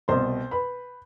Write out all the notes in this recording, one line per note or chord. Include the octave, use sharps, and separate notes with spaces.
C2 B2 C5 C6
B4 B5